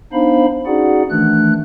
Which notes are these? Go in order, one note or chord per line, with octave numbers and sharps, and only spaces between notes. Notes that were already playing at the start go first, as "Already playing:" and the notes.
B3 D4 D#4 C5 F5 B5
C#4 D#4 F#4 G#4 D5 F#5
D#3 E3 A3 D4 F#6